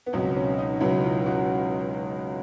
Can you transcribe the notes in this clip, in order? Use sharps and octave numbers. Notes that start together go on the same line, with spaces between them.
B3
C#2 B2 F#3 C4
C#4
D#4
C#2 B2 F#3 E4
F4
F#4